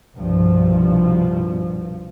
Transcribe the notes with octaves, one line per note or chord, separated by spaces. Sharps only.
C2 G2 B2 F3